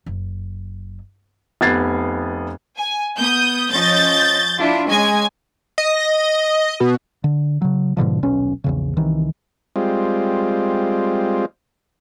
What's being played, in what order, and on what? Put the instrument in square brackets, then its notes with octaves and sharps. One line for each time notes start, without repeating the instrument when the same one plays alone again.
[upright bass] F#1
[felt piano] F1 B3 G#6 A6 C7
[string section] G#5
[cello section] B3 [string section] D#6 G6
[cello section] F3 C#4 D#5 [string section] G6 A6
[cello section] D4 E4 F4
[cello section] G#3 C#4 D#5 [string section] G#5 G#6
[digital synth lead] D#5
B2
[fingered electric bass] D3
C#3 F#3
G#2 B2 D3 F3
D#1 B1 C#4
A#1 E2 C#3
C2 D#3 E3
[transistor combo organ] G3 G#3 C4 F4